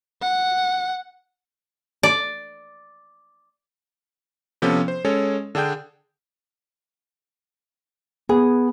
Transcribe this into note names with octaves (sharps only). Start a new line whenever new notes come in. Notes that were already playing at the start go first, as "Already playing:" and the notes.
F#5
D5
C3 F3 B3 C#4 A4
C5
G#3 C#4 A4 C#5
D3 D4 G#4 G5 G6
B3 G#4